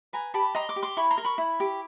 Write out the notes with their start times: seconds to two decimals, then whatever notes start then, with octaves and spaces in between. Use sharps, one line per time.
0.13 B4 G#5 A#5
0.34 G4 A5 B5
0.55 D#5 A#5 C6
0.69 C6 D6
0.76 G4
0.83 C6 D6
0.97 E4 B5 C#6
1.11 A#5 C6
1.18 A#4
1.24 B5 C#6
1.38 E4
1.60 G4